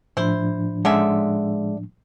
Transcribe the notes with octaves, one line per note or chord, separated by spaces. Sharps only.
A2 F3 D4 E4 C5
D3 G#3 C#4 E5